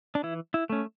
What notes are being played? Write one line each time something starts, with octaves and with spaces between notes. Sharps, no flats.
D4
E3 E4
E4
A3 C#4